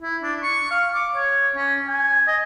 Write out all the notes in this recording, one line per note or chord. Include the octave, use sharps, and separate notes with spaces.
E4
D4
C#6
F5
D6
C#5
C#4
G#5
D#5